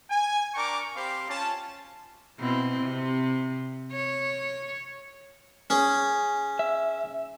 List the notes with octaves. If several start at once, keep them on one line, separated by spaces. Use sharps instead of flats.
G#5
D4 A#4 G5 A#5 C#6 D6
C4 G4 C5 F5 B5 C6
C#4 F4 A5
B2 C4 E4
C3
C#5
C#4 G#4
E5